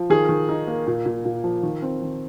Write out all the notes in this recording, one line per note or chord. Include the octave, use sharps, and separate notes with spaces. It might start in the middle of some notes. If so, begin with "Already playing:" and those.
Already playing: F3
D#3 G#4
D#3
D#4
A#3
A#2
A#2
A#2
F3
D#3
C4
D#3